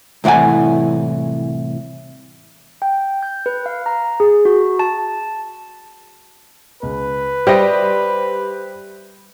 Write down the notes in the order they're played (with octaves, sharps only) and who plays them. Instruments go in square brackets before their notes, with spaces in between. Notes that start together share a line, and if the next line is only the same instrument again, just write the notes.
[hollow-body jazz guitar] C2 A2 E3 F#5 G#5
[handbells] G5
G6
B4
F5
A#5
G#4
F#4
A5
[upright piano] C#2 [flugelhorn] B4
[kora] G3 D#5 [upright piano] G4 C5 E5